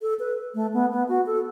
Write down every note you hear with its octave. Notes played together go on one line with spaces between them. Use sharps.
A4
B4
A3
B3
B3
F#4
A4